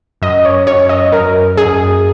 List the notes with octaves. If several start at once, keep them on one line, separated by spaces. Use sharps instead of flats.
F#2 D#5
C#5
F#2 C#5
D#5
F#2 A#4
F#2 G#4